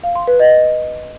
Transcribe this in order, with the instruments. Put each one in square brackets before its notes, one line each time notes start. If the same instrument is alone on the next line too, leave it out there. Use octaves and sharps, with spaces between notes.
[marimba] F5
C6
B4
D#5